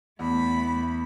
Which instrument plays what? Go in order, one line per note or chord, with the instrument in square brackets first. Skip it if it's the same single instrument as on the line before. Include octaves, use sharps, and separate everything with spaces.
[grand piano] E2 [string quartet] A3 B5